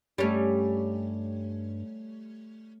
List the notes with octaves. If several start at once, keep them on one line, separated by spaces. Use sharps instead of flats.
G2 G3 A3 C#4 C#5